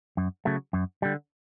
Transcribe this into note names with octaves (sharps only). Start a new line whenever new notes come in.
F#2
C#3 F#3 A3
F#2
D3 G3